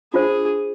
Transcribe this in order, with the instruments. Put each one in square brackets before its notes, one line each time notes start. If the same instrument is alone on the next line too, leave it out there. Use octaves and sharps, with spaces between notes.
[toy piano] D4 F4 C5 [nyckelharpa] G#4